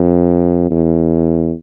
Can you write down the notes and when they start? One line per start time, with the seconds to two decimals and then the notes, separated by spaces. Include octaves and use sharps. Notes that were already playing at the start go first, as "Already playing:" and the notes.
Already playing: F2
0.70 E2